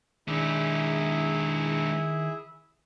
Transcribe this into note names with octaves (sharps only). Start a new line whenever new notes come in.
D#3 G#3 D4 E4 G#4 E5